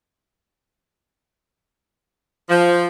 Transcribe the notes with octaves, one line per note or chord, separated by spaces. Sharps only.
F3